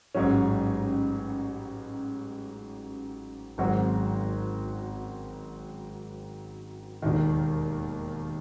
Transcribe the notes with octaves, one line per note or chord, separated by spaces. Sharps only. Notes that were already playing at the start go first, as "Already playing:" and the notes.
A1 G#2 F#3 C#4
G#1 G#2 F#3 C4 F#4
E1 D#2 D#3